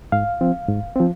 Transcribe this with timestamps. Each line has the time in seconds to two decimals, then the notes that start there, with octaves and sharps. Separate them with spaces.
0.12 G#2 F5
0.41 F3 C4
0.69 G#2
0.96 F3 C4